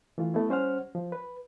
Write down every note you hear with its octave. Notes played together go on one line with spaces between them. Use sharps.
E3 A3 F4
A3 B3 E4
G3 C#4 C5 F#5 F6
F3
B4